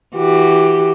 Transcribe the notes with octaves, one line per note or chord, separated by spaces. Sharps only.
E3 F#4 G4